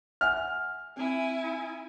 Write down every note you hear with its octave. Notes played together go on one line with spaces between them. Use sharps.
E5 F#5 G#5 F6
C4 E4 G#5